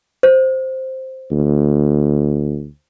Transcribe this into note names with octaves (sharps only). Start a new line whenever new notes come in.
C5
D2